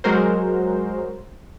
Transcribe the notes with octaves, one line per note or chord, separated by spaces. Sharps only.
F#3 G#3 F#4 A#4 C5